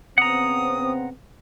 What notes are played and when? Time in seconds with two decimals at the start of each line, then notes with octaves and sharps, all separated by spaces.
0.18 C#3 B3 C4 F#5 A#5 D#6